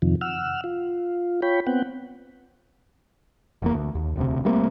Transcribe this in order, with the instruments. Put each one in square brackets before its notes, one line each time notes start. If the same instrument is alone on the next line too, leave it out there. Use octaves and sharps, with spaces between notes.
[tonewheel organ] F2 C3 D#3 F3
F#5 E6 F6
F4
F4 C#5 G5 B5
B3 C4 F#5 G5
[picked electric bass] F1 E2 A#3
D2
D#2
E1 D2 C3
G3 A3 A#3 C4